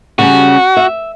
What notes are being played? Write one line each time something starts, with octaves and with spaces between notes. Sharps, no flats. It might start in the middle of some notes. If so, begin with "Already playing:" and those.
C#3 G3 C#4 F#4
E5